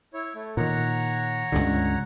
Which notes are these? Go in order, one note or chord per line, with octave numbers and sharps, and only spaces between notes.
E4 C#5
A3
A#2 D#3 C#5 F#5 A#5
C#2 G2 D3